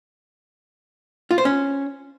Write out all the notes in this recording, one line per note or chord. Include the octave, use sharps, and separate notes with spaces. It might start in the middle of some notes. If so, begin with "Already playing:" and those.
F4
C5
C#4